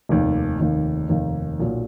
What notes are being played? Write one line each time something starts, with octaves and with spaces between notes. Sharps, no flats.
F1 D#2 D#3
F1 D#2 D#3
F1 D#2 D#3
B1 A#2 F#3